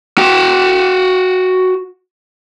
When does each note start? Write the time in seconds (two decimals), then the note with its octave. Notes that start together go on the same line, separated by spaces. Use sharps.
0.18 F#4 G5